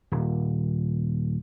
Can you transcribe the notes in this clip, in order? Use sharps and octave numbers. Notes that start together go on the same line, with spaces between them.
D#1